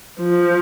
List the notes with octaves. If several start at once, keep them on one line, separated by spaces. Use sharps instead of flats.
F3